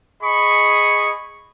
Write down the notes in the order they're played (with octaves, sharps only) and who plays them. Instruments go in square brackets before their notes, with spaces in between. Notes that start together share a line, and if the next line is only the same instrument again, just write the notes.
[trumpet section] G#4 D#5 B5 C#6